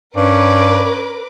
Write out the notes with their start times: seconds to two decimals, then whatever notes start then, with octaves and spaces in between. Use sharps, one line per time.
0.16 G2 C#4 A#4 B4 D5 D6